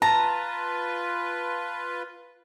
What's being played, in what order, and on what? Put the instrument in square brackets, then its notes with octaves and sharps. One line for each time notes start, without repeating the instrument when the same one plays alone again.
[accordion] F4 B4 [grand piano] A5 [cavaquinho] A#5